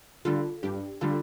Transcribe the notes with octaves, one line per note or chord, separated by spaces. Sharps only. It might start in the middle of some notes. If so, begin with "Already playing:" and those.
D3 G3 F4 A4
G2 D4 G4
D3 G3 F4 A4